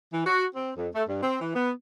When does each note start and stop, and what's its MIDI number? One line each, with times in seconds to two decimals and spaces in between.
0.13 0.23 52
0.26 0.44 66
0.55 0.71 60
0.77 0.88 41
0.94 1.03 57
1.08 1.19 43
1.22 1.39 60
1.41 1.53 52
1.55 1.71 59